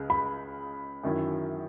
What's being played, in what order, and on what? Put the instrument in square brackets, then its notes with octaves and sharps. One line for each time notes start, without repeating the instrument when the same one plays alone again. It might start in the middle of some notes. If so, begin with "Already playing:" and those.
Already playing: [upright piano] C#2 C#3 G#3
[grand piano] B5
[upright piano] F#2 D#3 F#3 C#4 E4